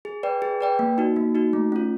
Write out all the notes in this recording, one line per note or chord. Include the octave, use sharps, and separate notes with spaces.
G#4
B4 D5 G5
G#4
B4 D5 G5
A#3
D#4 F#4
A#3
D#4 F#4
A3
C#4 F4